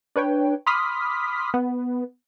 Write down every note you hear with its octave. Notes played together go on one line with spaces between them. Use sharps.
D4 B4 C#5 G5
B5 C6 D6 D#6 F6 B6
B3